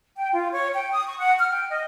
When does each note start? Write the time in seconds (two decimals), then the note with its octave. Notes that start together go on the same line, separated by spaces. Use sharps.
0.16 G5
0.32 F4
0.51 C#5
0.74 G5
0.91 D#6
1.06 C#6
1.18 F#5
1.38 F6
1.51 G5
1.69 D#5